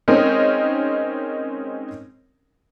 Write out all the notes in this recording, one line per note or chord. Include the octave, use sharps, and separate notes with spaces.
G#3 C4 C#4 D#4 A#4